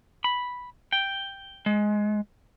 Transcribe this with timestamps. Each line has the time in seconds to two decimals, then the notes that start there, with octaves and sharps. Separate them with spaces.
0.24 B5
0.92 G5
1.66 G#3